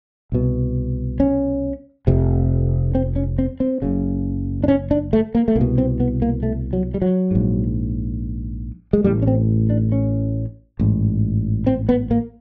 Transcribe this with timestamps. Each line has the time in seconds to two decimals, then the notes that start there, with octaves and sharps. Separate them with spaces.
0.32 C2 B2
1.20 C#4
2.07 F1 F2 C3
2.95 C4
3.16 C#4
3.38 C4
3.60 C4
3.82 F#1 F#2 C#3
4.64 D4
4.68 C#4
4.91 D4
5.13 A3
5.35 A#3
5.48 A3
5.55 C2 A#3
5.61 B2
5.78 C4
6.00 B3
6.22 A#3
6.43 A3
6.73 F#3
6.94 G3
7.02 F#3
7.31 A#1 G#2
8.93 G#3
9.04 A1 A2 G3
9.22 C#4
9.27 C4
9.70 D4
9.92 C#4
10.79 A1 G#2
11.67 C4
11.89 B3
12.11 A#3